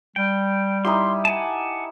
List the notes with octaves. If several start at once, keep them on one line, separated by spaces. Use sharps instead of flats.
G3 G5
D#4 E4 G4 C6
F#5 G#5 A5